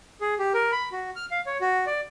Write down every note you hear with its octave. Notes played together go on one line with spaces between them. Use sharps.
G#4
G4
A#4
B5
F#4
F6
F5
C#5
F#4
D5